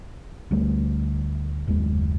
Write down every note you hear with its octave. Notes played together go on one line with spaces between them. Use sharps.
D2 G3 A3
F#1 D#2 G#3